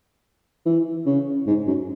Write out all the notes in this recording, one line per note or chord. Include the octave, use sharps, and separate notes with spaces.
E3
C#3
G#2
F#2